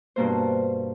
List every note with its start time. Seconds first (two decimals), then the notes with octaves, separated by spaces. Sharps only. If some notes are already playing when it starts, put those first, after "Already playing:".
0.16 G2 B2 A#3 C5